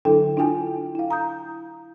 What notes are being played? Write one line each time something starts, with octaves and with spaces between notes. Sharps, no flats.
D3 F#3 D4 E4 A4 G5
D4 E4 F4 G5 G#5
E4 F5
A#5 D#6 G6